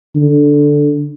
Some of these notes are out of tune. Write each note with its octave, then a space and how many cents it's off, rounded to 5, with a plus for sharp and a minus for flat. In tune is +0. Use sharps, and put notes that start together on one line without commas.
D3 -5